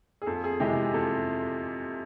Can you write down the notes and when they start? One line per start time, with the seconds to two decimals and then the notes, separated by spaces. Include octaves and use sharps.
0.22 G#4
0.26 F2 A4
0.44 G#4
0.60 C3 E3 G#3 G4
0.94 F2 A4